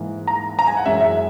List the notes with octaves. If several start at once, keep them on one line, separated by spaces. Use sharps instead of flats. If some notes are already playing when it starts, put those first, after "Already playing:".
Already playing: G#2 E3 A#3
A#5
A#5
G#5
F#5
F#2 E3 G#3 C#4 E5
E5